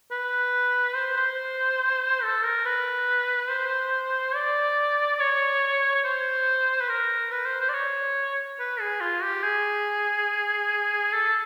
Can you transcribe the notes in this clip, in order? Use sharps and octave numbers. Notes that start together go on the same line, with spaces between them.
B4
C5
C5
A4
A#4
B4
C5
D5
C#5
C#5
C5
B4
A#4
B4
C5
C5
D5
C#5
B4
G#4
F4
G4
G#4
A4